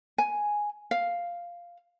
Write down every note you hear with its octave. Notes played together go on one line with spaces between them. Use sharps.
G#5
F5